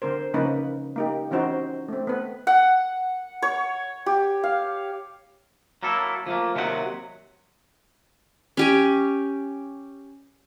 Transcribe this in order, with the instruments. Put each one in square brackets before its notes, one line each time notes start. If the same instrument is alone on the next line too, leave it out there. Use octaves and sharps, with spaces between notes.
[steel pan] D3 C4 A#4 C5
C#3 F3 A#3 C#4 D#4 B4
A#3 D#4 G4
E3 C4 C#4 D#4 F#4 C5
A3 C4
B3 B4
[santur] F#5
C#5
G4
F5
[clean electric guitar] F#3 A#3 E4 A4
F3 A3 A#3
D#2 C3 D#3 F#3 G4 F#5
[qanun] C#4 G4 G#5